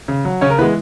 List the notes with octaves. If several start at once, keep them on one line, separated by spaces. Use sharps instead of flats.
C#3
F#3
C#3 C#4 C#5
A#4
E3 G#3 B3 B4